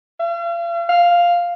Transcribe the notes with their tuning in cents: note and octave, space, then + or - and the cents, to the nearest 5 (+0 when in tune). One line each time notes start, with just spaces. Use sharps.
F5 -40
F5 +0